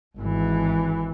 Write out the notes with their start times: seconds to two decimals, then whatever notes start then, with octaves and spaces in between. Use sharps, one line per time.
0.18 G#1 E3